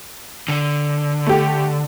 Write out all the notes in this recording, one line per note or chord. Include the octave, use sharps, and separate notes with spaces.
D3
A3 G4